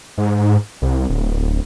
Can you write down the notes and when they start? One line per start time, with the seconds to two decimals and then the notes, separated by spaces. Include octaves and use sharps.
0.18 G#2
0.82 C2
1.10 D1